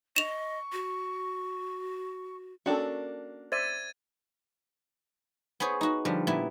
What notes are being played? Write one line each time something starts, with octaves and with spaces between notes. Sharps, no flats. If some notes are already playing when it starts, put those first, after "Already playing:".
D#5 C#6 E7 F7
F#4
A#3 C#4 D4 F#4 A4
C5 D5 E5 G#6 A6 D#7
B3 G#4 C5 C#5
D#4 F#4
D3 F3 G3
A#2 B3 E4